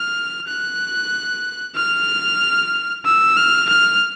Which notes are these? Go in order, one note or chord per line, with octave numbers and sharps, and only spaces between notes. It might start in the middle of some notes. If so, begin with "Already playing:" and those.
Already playing: F6
F#6
F6
E6
F6
F6